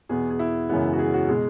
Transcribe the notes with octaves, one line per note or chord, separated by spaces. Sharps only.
E2 B2 B3 G#4
G#4
E4
F#2 C#3 E3 G#3 B3
F#4
G#4
F#4
B2 G#3 G#4